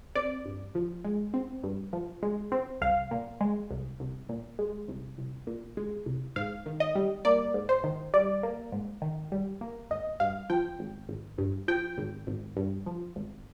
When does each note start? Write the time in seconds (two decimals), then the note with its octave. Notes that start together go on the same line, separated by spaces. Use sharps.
0.15 C4 D5
0.45 G2
0.75 F3
1.05 G#3
1.34 C4
1.63 G2
1.93 F3
2.23 G#3
2.52 C4
2.81 C2 F5
3.11 A#2
3.41 G#3
3.70 C2
4.00 C2
4.29 A#2
4.59 G#3
4.88 C2
5.18 C2
5.47 A#2
5.77 G#3
6.06 C2
6.36 G#2 F5
6.66 D#3
6.80 D#5
6.95 G3
7.25 A#3 D5
7.54 G#2
7.69 C5
7.84 D#3
8.13 G3 D5
8.43 A#3
8.72 G#2
9.02 D#3
9.32 G3
9.61 A#3
9.90 G#1 D#5
10.20 G2 F5
10.50 F3 G5
10.79 G#1
11.09 G#1
11.38 G2
11.68 F3 G5
11.98 G#1
12.27 G#1
12.57 G2
12.86 F3
13.16 G#1